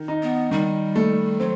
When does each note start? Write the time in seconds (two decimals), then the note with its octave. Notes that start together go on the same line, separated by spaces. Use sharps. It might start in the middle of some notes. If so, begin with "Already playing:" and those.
Already playing: D#3
0.08 D#4
0.23 B3
0.51 D#3 G3
0.96 A3
1.40 F#3 C4